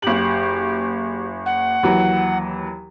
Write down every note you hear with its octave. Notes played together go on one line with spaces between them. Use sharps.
F#1 G4 F#7
F#5
D#2 E3 F#3